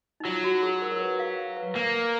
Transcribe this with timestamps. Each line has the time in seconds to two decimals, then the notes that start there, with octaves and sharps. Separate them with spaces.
0.20 D#4
0.25 F#3 F4
0.44 F#4
0.63 G#4
0.82 A#4
0.92 A#4
1.01 B4
1.19 F5
1.57 B4
1.76 A#3